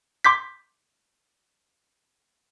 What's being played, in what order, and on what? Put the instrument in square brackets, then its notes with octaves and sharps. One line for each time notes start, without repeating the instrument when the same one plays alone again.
[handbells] C6 D6 G6 B6